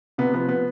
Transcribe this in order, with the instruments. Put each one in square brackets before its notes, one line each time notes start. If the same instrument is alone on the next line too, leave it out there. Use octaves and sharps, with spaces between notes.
[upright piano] C3 B3
F3 B3
B3